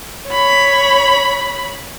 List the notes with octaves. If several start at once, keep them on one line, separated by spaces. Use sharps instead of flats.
C#5 B5